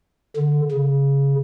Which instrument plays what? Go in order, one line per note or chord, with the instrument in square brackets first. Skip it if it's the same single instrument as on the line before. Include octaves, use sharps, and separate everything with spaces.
[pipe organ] D3
C#3